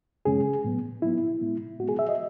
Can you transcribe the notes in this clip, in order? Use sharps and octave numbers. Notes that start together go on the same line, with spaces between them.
F#2 C#3 G#3 C#4 G#4
A2 F#3 B3
A2 F#3 B3 E4
A2 G#3 B3
A2 G#3 B3 F#4
G#4
E5
D#5